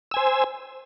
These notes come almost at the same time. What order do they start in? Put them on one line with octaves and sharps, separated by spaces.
E6 G#5 C5